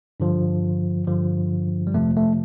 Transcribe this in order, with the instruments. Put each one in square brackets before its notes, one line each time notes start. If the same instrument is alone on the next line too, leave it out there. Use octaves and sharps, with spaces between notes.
[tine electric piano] G2 D3 F3
G2 D3 F3
G3
F2 C3 F3 A3
A3